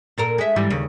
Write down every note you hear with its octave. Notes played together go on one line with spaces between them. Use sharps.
A#2 A4 A#4
G#3 E5
G#2 E3 G3
D#2 C#3